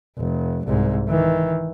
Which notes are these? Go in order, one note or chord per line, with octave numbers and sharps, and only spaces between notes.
F1
C2 G#2
D#3 E3